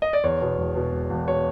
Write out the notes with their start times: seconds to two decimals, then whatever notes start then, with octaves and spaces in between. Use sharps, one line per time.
0.02 D#5
0.13 D5
0.24 E2 C#5
0.42 B2
0.58 E1
0.76 B2
0.92 E1
1.10 E1
1.27 B2 C#5